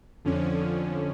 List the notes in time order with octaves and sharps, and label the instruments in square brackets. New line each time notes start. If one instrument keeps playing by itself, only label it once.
[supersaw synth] F2 D3 F3 C#4